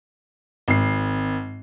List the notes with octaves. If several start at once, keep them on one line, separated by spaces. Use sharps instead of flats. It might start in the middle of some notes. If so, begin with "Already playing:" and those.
G#1 C7